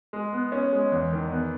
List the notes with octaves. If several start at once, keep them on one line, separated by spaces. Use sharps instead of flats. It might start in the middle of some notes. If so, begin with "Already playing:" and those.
G#3
B3
C#4
G#3
E2
D#3
B3